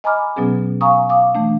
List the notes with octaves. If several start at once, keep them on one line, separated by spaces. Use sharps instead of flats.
D#5 G#5 A#5 B5 D6 F6
B2 F#3 B3 C#4 G#4
F5 G#5 A#5 C#6 D#6
F5 D6 D#6
E3 A3 D4